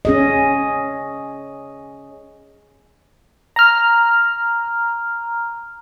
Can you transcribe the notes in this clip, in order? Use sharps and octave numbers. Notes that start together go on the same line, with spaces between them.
C#4 G#4 D#5
A#5 F6